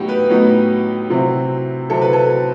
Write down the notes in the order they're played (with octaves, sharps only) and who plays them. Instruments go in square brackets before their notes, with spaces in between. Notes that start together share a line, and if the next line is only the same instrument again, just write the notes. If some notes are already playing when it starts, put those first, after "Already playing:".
Already playing: [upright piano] A2 F#3 B3 D#4 F#4 G4
B4
A2 F#3 B3 D#4
C3 F#3 C4 E4
C3 F#3 C4 E4 A4
B4
A4